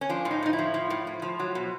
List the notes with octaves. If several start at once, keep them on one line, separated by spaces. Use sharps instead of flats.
C#4
F3 D4
A2
D#4
A2 D#4
E4
F3
F3
A2
A2
F3
F#3
B2